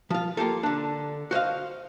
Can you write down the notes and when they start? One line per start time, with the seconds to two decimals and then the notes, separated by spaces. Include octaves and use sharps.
0.10 F3 F4
0.37 A#3 F4 G4 A4
0.63 D3 D4
1.31 F#4 C5 D#5 F5